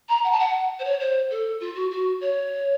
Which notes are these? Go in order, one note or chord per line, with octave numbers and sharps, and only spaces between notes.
A#5
F#5
A5
F#5
C5
C#5
C5
A4
F4
F#4
F#4
C#5